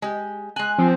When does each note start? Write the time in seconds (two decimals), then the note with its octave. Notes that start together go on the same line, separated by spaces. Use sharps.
0.02 G#3 G4
0.56 G#3 G#5 F#6
0.78 F3 C4